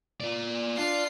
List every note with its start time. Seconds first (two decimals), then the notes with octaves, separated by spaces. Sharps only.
0.20 F4 D5
0.77 D4 F4 C7